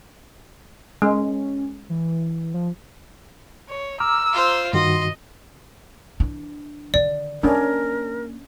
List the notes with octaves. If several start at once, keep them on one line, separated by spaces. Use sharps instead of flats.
G#3 C#4
E3
F3
C#5
A#5 D6 E6 F6
F4 C5
G2 D#3 F#4 D#5 C6
E3 D4
D3 D#3 D5
A#3 C#4 D4 A#4